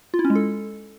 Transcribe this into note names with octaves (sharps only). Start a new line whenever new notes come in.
F4
E4
C#4
G#3
A4